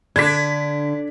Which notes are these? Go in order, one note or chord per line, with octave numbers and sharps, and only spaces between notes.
D3 D4 G#6 B6